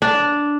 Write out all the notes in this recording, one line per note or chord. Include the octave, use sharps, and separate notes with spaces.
D4